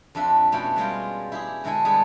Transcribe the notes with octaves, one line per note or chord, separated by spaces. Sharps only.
F2 D4 A4 E5 B5 C6
B2 A3 C#4 E4 G5
G3 G#3 F4 G5
E4 G4 G#4
D3 G#3 E4 A4 G#5
G3 B3 G#4 A4